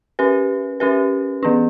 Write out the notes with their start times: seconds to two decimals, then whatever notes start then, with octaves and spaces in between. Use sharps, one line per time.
0.19 C#4 G4 B4
0.80 C#4 G4 B4
1.43 E3 B3 D4